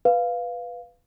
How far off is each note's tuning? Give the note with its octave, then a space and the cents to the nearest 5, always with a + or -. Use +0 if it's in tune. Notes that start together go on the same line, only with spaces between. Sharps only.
B4 +0 F5 +0